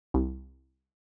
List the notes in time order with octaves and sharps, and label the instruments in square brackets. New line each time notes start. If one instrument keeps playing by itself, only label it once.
[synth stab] C2